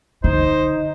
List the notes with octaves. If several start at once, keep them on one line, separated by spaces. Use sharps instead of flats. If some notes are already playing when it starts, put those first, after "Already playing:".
D3 D#4 C5